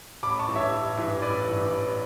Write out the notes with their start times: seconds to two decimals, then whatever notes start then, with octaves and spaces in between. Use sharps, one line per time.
0.23 A1 B5 D6
0.39 A5 C#6
0.48 G2 E3
0.56 C#5 E5
0.72 A1
0.97 G2 E3
1.22 A1 B4 D5
1.47 G2 E3
1.72 A1